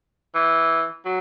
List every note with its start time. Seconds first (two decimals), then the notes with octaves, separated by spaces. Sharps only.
0.35 E3
1.06 F#3